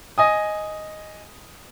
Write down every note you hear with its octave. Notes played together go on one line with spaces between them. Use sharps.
D#5 G#5 D#6